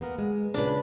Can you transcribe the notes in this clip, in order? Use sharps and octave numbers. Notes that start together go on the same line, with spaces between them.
A#3 B3 A#4
G#3
A#2 C#3 D4 B4